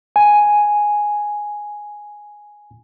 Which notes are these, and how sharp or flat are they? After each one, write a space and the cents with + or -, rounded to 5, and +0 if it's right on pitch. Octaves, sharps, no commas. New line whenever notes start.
G#5 +0